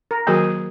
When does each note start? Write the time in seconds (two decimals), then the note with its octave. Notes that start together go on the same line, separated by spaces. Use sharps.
0.11 A#4
0.27 D#3 F#3 A#3 F#4 G#4 A#4